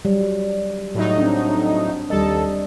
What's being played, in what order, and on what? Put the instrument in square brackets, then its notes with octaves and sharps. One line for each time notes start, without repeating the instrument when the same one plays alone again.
[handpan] F#3 G3
[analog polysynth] A2 F#3 D#4
[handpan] C4 D4
[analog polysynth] D#2 A4 [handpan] G3 D#5